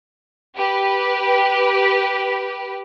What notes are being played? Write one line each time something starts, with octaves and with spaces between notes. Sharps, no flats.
G4 B4